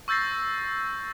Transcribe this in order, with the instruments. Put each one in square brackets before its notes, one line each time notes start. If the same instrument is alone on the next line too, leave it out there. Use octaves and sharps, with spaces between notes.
[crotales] C#6 E6 G6 A6 A#6 C7